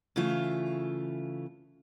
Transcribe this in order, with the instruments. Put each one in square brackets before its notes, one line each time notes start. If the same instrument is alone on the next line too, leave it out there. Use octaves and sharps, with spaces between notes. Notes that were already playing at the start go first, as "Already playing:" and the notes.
[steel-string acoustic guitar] C#3 E3 A3 F4